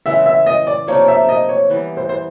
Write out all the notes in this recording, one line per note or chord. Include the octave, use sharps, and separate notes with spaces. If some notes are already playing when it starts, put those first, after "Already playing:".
C#3 E3 G#3 B3 E5
E5
D#5
D5
C3 F3 A#3 D#4 C#5
E5
D#5
C#5
E3 G3 B3
C5
C5